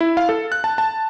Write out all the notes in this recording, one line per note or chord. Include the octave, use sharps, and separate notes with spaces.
E4
F5
A4
F#6
A5
A5